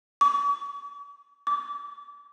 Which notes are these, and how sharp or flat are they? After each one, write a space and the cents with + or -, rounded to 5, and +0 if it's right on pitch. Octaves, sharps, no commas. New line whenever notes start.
D6 -45
D6 -25